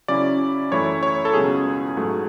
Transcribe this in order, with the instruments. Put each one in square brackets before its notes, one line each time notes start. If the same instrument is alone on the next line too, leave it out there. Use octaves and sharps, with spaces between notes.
[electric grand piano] C#3 F#3 C#4 E4 D5
F#2 E3 A3 E4 C#5
C#5
A4
C#2 B2 F#3 C#4 G#4
G#2 F#3 A3